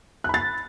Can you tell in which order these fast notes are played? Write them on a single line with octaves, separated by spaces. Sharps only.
F#6 B5 A6